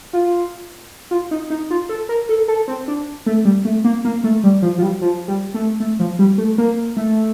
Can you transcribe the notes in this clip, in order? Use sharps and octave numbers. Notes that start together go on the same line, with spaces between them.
F4
F4
D#4
D#4
F4
A4
A#4
A4
A4
C4
D4
A3
G3
A3
A#3
A#3
A3
G3
F3
F3
G3
F3
G3
A3
A3
F3
G3
A3
A#3
A3